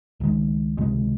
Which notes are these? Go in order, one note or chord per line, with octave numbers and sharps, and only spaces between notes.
C#2 C3 D#3 G#3
C#2 C3 D#3 G#3